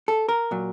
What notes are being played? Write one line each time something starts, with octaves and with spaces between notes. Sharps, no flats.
A4
A#4
A#2 F#3